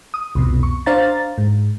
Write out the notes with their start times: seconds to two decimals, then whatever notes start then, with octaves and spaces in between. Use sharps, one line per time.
0.14 D#6
0.35 C2 F2 B2
0.63 C#6
0.86 D4 C5 F5 A#5 A6
1.38 G#2